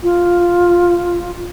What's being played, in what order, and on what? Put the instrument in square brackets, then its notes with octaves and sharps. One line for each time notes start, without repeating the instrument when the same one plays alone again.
[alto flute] F4